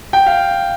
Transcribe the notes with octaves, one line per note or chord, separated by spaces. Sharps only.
G5
F5